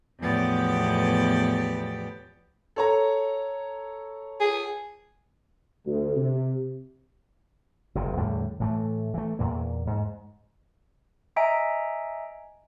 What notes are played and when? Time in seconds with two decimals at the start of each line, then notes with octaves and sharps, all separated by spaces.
0.20 E2 A2 F3 B3 G4 D5
2.76 A4 C#5 A#5
4.40 G#4
5.85 D2
6.16 C3
7.95 F#1 G2 C3
8.17 E2 A2 D3 G3
8.60 A2 E3 A3
9.14 E3 A3
9.39 E2 A#2 A#3
9.87 G#2
11.36 D#5 E5 G#5 A#5 D7